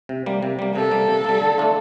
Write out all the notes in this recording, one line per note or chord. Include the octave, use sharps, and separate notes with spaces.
C3
G3 A#3
C3
G3 A#3
C3 A4
G3 A#3
C3
G3 A#3
D3
A3 D4 F4